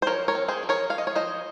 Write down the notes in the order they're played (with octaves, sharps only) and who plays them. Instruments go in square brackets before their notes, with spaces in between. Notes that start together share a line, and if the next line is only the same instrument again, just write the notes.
[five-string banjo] C5
F3 A#4 C#5
A#4 C#5
C4
G#4 C5
F3
A#4 C#5
F3 F5
D#5
C#5
F3 C5 D#5